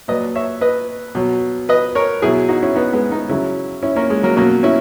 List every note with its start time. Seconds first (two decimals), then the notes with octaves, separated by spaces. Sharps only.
0.08 A#2 F#3 B4 D#5
0.35 C#5 E5
0.61 B4 D#5
1.15 B2 F#3
1.69 B4 D#5
1.95 A#4 C#5
2.22 B2 F#3 E4 G#4
2.49 D#4 F#4
2.63 C#4 E4
2.75 B3 D#4
2.93 G#3 B3
3.12 B3 D#4
3.29 C#3 F#3 C#4 E4
3.83 C#4 E4
3.96 A#3 C#4
4.10 G#3
4.23 F#3 A#3
4.36 B2 F#3 A#3 C#4
4.63 C#4 E4